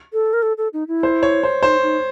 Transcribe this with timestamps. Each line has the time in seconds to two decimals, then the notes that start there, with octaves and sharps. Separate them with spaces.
0.13 A4
0.33 A#4
0.42 A4
0.58 A4
0.73 D#4
0.88 E4
1.03 C5
1.23 C#5
1.43 C5
1.62 D#4 C5
1.83 D#4